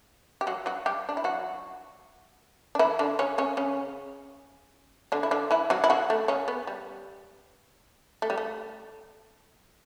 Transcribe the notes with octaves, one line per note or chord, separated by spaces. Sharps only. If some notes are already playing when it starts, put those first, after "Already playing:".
G4
F#3 F#4
F#3 F#4
G3 G4
D4
E4
F#3 F#4
D4
E3 E4
D3 D4
C#3 C#4
C#3 C#4
C#3 C#4
D3 D4
E4
D3 D4
E3 E4
F#3 F#4
E4
F#3 F#4
A3
C#3 C#4
B3
G3
A3
G3
A3